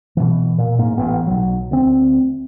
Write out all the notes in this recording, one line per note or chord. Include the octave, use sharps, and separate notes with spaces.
B2 E3
A#2
G#2 A#3
A1 B3
B1 F#3
D2 C4